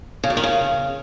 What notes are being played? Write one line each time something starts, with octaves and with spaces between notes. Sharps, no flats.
C#3
F#2
D#3
C#3